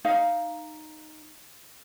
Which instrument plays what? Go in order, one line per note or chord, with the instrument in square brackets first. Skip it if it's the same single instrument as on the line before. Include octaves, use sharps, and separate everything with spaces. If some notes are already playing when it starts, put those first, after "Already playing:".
[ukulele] D#4 F5